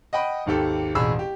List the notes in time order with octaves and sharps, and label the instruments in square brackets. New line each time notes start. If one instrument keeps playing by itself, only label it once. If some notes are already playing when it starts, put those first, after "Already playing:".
[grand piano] D#5 F#5 G5 B5 D#6
G#1 D#2 G4 A4
E1 A1 G#4 B5 E6
G4